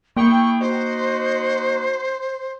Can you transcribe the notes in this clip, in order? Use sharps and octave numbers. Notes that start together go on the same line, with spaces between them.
A#3 E4 G#4 G5 C#6
D#4 F#4 C5